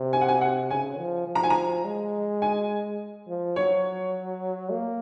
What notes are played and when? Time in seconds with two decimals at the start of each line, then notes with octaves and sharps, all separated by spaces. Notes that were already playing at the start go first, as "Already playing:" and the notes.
Already playing: C3
0.13 G#5
0.21 F#5
0.28 G#5
0.41 F#5
0.70 C#3 G#5
0.99 F3
1.27 F3
1.35 A#5
1.44 G#5
1.50 A#5
1.85 G#3
2.42 G#5
3.28 F3
3.56 F#3 C#5
4.71 A#3